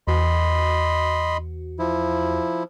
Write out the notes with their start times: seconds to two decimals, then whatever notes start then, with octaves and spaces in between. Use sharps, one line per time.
0.08 E2 F#4 D#5 B5 C6
1.79 F3 E4